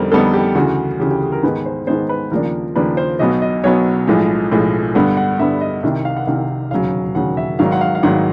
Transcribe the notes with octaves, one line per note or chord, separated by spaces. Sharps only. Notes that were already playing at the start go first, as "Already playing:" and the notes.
Already playing: F2 D3 G3 B3 D#4 A#4 C5
F2 D3 G3 B3 D#4 A4
G4
D2 C#3 E3 F#4
D2 C#3 E3 G4
G4
G#4
A#4
G#2 D#3 G#3 B3 B4
C5
G#2 D#3 G#3 B3 C5
B4
D#2 C#3 F3 A#3 D4 A#4
D#2 C#3 F3 A#3 D4 B4
C5
B1 B2 F#3 B3 D#5
D#5
B1 B2 F#3 B3 C#5
B1 A2 F3 G#3
B1 A2 F3 G#3
G2 D3 G3 B3 F#5
F#5
G2 D3 G3 B3 E5
D#5
C2 C3 D#3 E5
F5
F#5
C2 C3 D#3 F5
E1 D#2 C#3 F#3 F5
E1 D#2 C#3 F#3 F#5
E5
G#1 G#2 D#3 F#3 F5
F#5
F5
F5
G#1 G#2 D#3 F#3 F#5